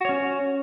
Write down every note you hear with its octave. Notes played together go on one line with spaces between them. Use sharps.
C#4 F#4 C#5